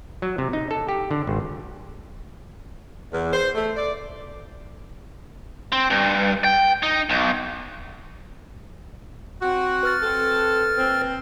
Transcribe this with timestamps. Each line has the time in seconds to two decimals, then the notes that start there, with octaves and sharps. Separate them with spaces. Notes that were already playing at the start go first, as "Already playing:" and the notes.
0.22 F#3
0.38 C3
0.53 D#4
0.71 A4
0.89 G4
1.11 D3
1.27 G#1
3.12 E2
3.33 C5
3.55 A3
3.76 D5
5.72 C4
5.90 G2
6.44 G5
6.83 D#4
7.10 B1
9.42 C4 F#4
9.83 B4 F6 A6
10.02 C4 A4
10.77 A#2 C4